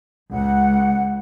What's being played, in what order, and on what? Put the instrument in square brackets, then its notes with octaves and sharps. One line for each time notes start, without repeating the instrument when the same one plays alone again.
[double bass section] C#2 [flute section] F#5